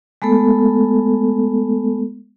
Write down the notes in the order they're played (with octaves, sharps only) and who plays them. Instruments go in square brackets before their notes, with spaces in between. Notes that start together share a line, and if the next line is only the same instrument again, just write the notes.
[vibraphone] G#3 A3 B3 A4